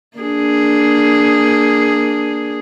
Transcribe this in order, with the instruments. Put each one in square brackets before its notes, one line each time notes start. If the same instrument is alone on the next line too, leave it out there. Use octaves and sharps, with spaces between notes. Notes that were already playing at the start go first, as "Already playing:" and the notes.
[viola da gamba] A#3 D4 G#4